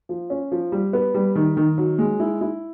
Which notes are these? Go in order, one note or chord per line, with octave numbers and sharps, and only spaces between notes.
F3
C#4
F3
G3
B3
G3
D#3
D#3
F#3
G#3
E4
E4